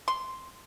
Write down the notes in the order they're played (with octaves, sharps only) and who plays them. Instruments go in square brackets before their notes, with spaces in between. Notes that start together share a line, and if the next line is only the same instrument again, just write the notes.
[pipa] C6